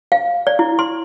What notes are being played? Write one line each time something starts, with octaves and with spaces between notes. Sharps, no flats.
F5
D5
E4
C6